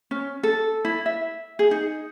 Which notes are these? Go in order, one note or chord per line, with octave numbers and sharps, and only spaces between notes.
C#4
A4
E4
E5
G#4
D#4